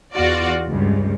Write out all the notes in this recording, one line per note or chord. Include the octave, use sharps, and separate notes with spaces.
E2 F4 F#4 D5
C#2 G2